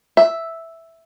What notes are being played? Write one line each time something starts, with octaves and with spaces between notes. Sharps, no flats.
E5